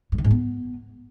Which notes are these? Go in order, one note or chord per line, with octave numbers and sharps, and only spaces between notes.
G2
D#3
G#2
B3